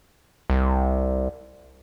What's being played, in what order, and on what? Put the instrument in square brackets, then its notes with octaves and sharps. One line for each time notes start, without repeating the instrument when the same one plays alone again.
[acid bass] C2